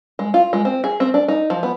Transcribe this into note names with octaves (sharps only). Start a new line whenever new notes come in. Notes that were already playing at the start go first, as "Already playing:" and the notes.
G#3
F4
G#3
C4
G#4
C4
D4
D#4
F3
B3